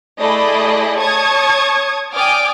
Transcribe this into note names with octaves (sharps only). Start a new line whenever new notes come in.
A3 E4 G#4 D5 D#5 B5
C#5 A5 C#6 D#6 G#6
D5 G5 G#5 D6 D#6 F6